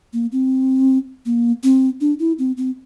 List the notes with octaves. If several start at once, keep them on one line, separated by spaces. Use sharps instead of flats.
A#3
C4
A#3
C4
D4
E4
C4
C4